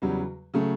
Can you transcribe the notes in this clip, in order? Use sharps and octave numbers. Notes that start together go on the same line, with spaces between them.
E2 C#3 F#3 G3
C#3 F#3 A3